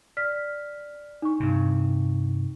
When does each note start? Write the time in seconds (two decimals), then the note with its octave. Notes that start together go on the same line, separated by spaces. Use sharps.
0.17 D5 F6 B6
1.22 D#4 C#6
1.40 G2 C3